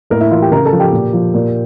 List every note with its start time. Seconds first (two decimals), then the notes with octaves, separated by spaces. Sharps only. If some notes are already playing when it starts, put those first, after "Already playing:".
0.10 A2 A#3 A#4
0.21 E4 E5
0.31 E3 F4 F5
0.42 G4 G5
0.52 C#3 A#4 A#5
0.65 A4 A5
0.72 F3
0.80 G4 G5
0.92 A#2
1.13 F3
1.34 A#2